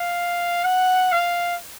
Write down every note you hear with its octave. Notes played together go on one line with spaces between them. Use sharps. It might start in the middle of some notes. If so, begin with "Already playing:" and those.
Already playing: F5
F#5
F5